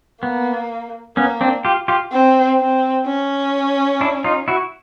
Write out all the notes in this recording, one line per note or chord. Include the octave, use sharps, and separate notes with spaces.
A#3 B3
A#3 B3 C#4
C4 D4
F4 G4
F4 G4
C4
C4
C#4
D4 E4
D#4 F4
E4 F#4